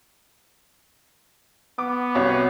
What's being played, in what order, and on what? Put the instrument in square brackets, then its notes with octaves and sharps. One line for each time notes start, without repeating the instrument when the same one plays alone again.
[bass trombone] B3 [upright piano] D6
[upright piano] C2 F#4 C#5